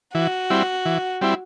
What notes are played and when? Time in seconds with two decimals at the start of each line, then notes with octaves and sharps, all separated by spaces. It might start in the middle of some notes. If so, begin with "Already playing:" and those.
0.14 E3 F#4
0.50 G3 C4 E4
0.85 E3
1.21 G3 C4 E4